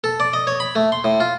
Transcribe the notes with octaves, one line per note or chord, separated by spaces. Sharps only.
A4
D5
D#5
C#5
B5
A3
C6
A2
F4